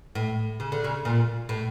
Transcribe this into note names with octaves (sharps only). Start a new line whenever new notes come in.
A2
C#3
D3
C#3
A#2
A2